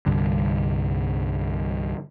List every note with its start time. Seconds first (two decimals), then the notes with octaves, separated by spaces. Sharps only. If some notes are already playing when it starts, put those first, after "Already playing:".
0.06 C2 G2 D3